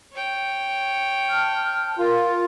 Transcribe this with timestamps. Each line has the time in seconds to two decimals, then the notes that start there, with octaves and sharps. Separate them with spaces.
0.12 C#5 G5
1.29 A5 F6
1.99 F4 A#4